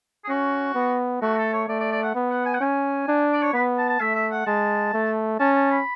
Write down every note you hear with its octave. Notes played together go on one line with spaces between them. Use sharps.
G#4
C#4 F#4
B3
A3 F#4
A4
C#5
A3 D5
D5
D5
F#5
B3
F#5
G#5
F#5
C#4 G#5
D4
D5
C#5
B3 B4
A5
A5
A3 E5
E5
F#5
G#3 A5
A3
C#4 A5
A5
B5